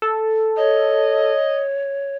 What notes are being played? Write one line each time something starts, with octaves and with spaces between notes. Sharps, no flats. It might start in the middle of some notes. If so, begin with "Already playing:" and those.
A4
C#5 D#5